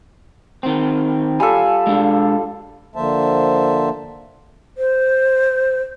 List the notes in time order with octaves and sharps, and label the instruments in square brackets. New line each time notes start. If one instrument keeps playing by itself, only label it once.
[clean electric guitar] D#3 C4
[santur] G3 F4 A4 [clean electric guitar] G#5
[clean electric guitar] G#3 D4
[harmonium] D3 F3 A#3 C5 E5 A5
[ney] C5